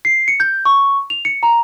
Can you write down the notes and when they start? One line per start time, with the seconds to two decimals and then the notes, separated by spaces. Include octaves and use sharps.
0.05 C7
0.28 C#7
0.40 G6
0.65 C#6
1.10 F7
1.25 C#7
1.43 A#5